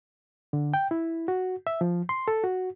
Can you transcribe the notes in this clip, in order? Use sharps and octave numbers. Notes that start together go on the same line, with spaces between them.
D3
G5
E4
F#4
E5
F3
C6
A4
F#4